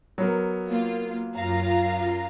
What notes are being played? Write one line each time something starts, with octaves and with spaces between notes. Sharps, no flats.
F#3 B3 A#4
A#3 F4
F#2 F4 F5 A#5